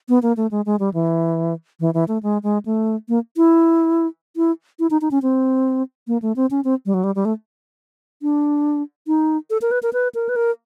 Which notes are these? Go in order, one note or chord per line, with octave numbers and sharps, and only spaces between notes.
B3
A#3
A3
G#3
G#3
G3
E3
E3
E3
A3
G#3
G#3
A3
A#3
E4
E4
E4
D#4
D#4
C#4
C4
A#3
A3
C4
C#4
C4
G3
F#3
G3
G3
A3
D4
D#4
A4
A#4
B4
A#4
B4
A#4
B4
A#4